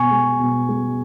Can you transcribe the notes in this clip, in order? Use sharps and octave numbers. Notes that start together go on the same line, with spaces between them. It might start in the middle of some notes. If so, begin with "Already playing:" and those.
Already playing: B2 G#5 C#6
G#3
B2
G#3